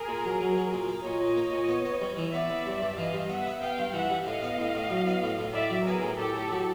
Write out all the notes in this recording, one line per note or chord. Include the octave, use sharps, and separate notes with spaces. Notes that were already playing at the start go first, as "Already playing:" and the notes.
Already playing: G#4 A#4
A#2
F#3
F#3
F#3
A#2
A#3
A#2 C#5 D#5
A#2
A#3
A#2
B3
B3
G3
E3
B3 D5 E5
B3
G2
G2
E3 D#5 F5
G2
B3 E5 F#5
B3
B3 F5 G5
G2
E3 E5 F#5
G3
A2 D#5 F5
B3
A2
A2
F#3
B3
A2
A2
A2 D5 E5
F#3
B3 G#4 A#4
A2
A2 G4 A4
A2
F#3